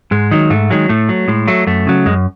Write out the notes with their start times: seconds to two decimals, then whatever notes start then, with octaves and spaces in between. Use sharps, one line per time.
0.11 G#2 G#3
0.31 D#3 F#3
0.50 G#2 A3
0.70 D#3 F#3 G#3
0.89 A2 A3
1.09 F#3
1.28 A2 G#3
1.47 F#3 A3
1.67 F#2 A3
1.87 C#3 F#3
2.06 F#2 G#3